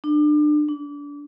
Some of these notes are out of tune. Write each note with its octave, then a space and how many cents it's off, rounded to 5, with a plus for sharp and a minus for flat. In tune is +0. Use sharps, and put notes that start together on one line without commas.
D4 +30
D4 -30